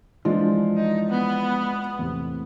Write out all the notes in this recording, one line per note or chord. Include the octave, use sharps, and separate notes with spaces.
E3 F3 G#3 D4 F4
D#4
B3
E2 A2 C3